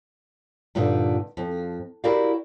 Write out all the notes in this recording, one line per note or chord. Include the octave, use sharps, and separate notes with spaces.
G2 A#2 D3 D#4
F2
E4 F#4 G4 A#4 D5 F5